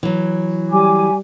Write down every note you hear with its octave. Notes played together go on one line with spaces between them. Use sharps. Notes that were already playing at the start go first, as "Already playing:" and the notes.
E3 F#3
G3 G#5 D6